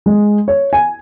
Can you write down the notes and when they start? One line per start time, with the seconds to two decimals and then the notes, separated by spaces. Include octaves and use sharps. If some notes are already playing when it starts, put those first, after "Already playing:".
0.06 G#3
0.48 C#5
0.73 G#5